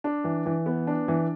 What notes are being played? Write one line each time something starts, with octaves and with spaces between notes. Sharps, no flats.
D4
E3
E3
B3
D4
E3